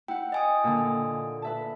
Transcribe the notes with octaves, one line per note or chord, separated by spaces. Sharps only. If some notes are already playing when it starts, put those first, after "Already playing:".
E4 F#5 G5
D#5 G#5 D#6
A#2 D3
B4 E5 A5